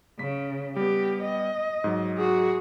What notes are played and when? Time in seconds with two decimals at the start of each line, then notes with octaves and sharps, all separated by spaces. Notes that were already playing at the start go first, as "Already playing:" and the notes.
0.19 C#3 B6
0.76 G3 B3 G4
1.23 D#5
1.84 G#2 F#3
2.18 F#4 G#4